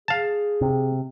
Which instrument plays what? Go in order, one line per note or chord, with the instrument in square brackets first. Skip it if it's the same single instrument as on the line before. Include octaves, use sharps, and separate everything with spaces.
[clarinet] G#4 [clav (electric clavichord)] F5 A5
[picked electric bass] C3